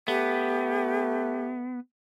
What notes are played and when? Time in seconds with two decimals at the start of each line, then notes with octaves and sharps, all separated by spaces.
0.08 A3 B3 G4